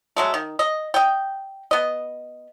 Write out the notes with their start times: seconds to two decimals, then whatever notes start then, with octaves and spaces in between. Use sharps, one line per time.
0.17 F#3 G#3 A3
0.34 D#3
0.59 D#5
0.94 D#5 G5
1.71 B3 D#5